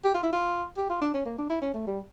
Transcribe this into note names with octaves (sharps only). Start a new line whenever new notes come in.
G4
F4
E4
F4
G4
F4
D4
C#4
A#3
D4
E4
C#4
A3
G3